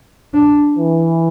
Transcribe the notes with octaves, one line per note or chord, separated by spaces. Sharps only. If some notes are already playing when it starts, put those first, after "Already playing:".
D4
E3